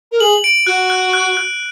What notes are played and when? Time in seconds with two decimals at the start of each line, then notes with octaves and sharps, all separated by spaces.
0.12 A#4
0.20 G#4 F#7
0.44 D7
0.67 F#4 F#6
0.90 F#6
1.13 F#6
1.37 F#6